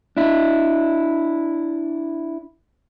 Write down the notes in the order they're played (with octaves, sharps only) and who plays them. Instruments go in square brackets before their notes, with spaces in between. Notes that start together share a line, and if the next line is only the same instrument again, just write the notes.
[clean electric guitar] D4 E4